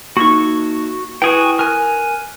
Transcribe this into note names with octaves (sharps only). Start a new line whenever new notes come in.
A#3 D#4 F#4 C#6
E4 F#4 G#4 B4 G5
A#4 G#5 F#6